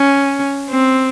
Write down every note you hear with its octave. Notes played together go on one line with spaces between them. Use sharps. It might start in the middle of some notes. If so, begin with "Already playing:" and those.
Already playing: C#4
C4